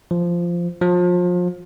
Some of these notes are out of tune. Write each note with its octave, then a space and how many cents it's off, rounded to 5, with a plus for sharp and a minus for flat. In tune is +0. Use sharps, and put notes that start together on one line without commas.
F3 -10
F3 +30